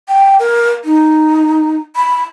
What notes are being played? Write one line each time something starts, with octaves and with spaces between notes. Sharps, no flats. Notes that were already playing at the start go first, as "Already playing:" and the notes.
G5
A#4
D#4
B5